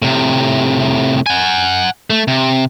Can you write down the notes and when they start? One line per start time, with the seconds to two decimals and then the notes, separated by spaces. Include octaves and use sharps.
0.02 A2 C3
1.26 F#5 G#5
2.10 A3
2.28 C3